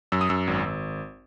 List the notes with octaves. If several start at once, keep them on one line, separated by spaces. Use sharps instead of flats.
F#2 E6
D#6
F#2 E6
G#1
G#1